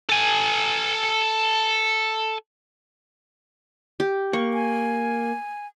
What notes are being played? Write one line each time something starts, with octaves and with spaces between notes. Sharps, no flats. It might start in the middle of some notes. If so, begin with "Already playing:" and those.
A4 G#5
G4
A#3 C#6
G#5